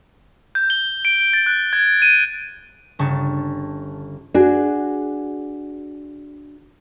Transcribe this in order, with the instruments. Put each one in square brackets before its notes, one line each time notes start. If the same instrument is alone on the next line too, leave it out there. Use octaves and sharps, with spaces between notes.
[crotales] G6
G7
D7
A6
F#6
G#6
D#7
[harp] G1 C#3 A5 C#6
[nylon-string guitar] D4 F#4 G#4